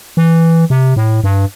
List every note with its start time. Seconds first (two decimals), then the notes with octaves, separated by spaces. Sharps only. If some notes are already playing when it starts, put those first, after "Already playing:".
0.17 E3
0.70 C3
0.96 A2
1.24 G2